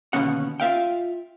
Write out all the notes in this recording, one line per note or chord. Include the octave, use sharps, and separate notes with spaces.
D#2 B2 D3 B3 C#4 F#5
F4 E5 F5 G5